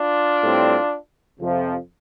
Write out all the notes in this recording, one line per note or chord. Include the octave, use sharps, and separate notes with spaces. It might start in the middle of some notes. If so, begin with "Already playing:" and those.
Already playing: D4 F4
A2 G3 C4
F2 C3 F3